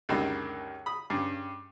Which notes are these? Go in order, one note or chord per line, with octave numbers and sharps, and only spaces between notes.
C#2 F#2 D3 D#3 G3 A#3
B5 D#6
G2 C#3